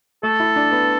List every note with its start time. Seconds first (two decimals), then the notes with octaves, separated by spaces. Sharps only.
0.23 A3 A4
0.40 E4
0.56 D4
0.72 B3